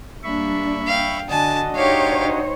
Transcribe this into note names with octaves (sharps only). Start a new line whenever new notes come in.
G3 A#3 D4 E5 B5 C#6
F5 G5
D3 D4 F#4 D#5 G#5 A5
D#4 G4 C5 C#5 F5